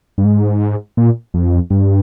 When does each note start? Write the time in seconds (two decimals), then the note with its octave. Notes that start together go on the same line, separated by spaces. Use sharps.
0.18 G2
0.25 G#2
0.97 A#2
1.34 F2
1.70 G2